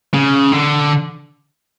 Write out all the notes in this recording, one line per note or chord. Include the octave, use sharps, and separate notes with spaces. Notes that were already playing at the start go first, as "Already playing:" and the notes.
C#3
D3